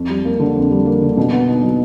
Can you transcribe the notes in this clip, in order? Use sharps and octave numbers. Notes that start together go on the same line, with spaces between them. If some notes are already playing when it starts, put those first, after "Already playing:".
Already playing: F2
G3
A#3
D3
F2
G3
A#3
D3
B2
B3
D#4
F#3